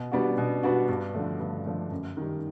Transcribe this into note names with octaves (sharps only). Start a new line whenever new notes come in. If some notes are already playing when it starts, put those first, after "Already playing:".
Already playing: B2
G3 B3 D4 F#4
B2
G3 B3 D4 F#4
G2
D3 F3 A3
G2
D3 F3 A3
F#2
D#3 G3